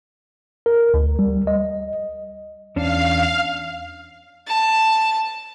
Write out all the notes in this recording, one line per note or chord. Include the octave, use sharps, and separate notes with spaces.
A#4
D2
G3
D#5
E2 C#4 D4 F5
A5